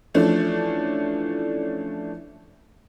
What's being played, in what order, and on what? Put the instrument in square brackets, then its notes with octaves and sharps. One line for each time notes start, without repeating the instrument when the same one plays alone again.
[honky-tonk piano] E3 F3 A3 C#4 D4